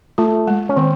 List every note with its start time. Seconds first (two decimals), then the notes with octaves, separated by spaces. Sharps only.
0.18 A3 F4
0.47 G#3
0.69 C#4
0.77 D#3 C4